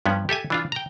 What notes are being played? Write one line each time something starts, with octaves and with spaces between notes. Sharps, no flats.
G2 F3 B3 C#4
G4 A4 E5 G#5
E3 D4 F4
G5 A#5